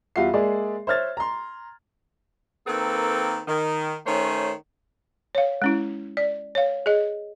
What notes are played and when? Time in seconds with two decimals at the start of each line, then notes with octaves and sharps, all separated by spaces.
0.16 E2 G3 F4 F#4 E5 C7
0.33 G#3 A#3 G#4 D5 E5
0.87 C5 C#5 E5 F6 G#6 A6
1.17 A#5 C6
2.67 D#3 A#3 C4 A4 B4
3.47 D#3
4.06 D#3 A3 C#4 C5 C#5
5.35 C#5 F5
5.62 G#3 C#4 E4
6.17 D5
6.55 C#5 F5
6.86 G#4 D#5